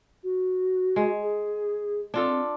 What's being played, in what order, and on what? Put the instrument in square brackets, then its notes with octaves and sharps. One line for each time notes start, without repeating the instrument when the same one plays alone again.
[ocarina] F#4
[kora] G#3
[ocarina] G#4
[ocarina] C4 [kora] D4 F4 A4